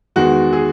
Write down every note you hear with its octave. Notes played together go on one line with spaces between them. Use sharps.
E2 D#3 G#3 F#4
G#4